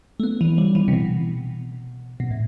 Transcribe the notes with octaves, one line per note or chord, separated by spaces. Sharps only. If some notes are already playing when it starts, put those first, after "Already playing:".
A3
B3
E3
G3
E3
C3
B2
B2
A2